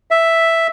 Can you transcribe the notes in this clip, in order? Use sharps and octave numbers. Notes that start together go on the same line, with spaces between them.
E5